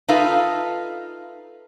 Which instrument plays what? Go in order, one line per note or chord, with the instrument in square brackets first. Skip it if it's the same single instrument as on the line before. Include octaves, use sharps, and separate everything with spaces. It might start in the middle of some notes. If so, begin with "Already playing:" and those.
[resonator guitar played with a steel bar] D#4 F4 A4 B4 E5 F5